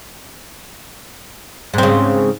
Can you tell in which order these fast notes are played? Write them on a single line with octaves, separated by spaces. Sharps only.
G#2 C4 C#3